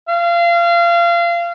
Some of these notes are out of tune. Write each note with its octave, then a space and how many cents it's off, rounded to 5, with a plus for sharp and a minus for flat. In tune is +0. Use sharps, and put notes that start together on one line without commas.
F5 -25